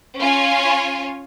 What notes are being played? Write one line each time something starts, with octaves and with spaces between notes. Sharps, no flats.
C#4 F4 C#5 G#5